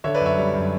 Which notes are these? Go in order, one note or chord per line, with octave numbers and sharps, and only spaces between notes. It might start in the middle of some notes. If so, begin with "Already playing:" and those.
D3 C#5 E5
B4 D5
F#2
C#5 E5
G3
F#2